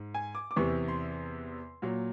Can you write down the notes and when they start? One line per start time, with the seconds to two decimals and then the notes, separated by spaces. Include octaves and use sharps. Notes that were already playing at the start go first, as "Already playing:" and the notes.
Already playing: G#2
0.14 G#5
0.35 D6
0.51 D6
0.56 E2 C3 E3 C#6
0.88 C6
1.82 A#2 F#3